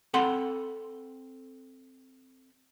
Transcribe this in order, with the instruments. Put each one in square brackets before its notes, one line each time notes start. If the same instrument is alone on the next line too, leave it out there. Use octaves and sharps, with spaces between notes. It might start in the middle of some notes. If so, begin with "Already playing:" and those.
[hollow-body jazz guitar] C4 A4 F#5 B5 C6